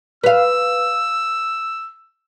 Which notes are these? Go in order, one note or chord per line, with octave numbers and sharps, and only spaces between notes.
B4 F5 E6